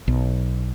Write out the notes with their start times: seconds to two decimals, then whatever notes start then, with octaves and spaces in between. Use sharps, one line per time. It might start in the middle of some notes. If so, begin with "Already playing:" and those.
0.08 B1